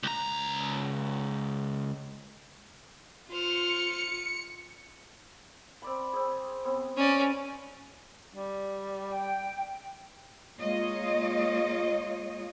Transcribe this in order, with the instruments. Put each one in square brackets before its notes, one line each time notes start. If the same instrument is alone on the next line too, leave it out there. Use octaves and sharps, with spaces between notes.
[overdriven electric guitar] C#2 A#5
[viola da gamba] F4 [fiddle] C5 F6 [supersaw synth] C#7
[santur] C4 D5 B5
C4 G#4
B3 C4
[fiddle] C#4 D5
[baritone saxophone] G3
[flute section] G5
[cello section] G#3 A#3 F4 C#5 D#5